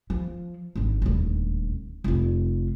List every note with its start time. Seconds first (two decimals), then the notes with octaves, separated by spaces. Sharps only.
0.10 F3
0.76 G#1 D3
1.02 D#1 D2
2.04 F1 F4